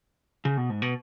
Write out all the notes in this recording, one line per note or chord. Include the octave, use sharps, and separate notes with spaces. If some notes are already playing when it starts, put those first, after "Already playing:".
C#3
B2
G#2
B2